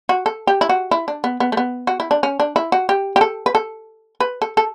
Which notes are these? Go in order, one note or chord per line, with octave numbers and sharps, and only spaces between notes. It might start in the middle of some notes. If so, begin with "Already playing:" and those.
F#4
A4
G4
E4
F#4
E4
D4
B3
B3
A3
B3
F#4
E4
D4
C#4
D4
E4
F#4
G4
G4
A4
B4
A4
B4
A4
A4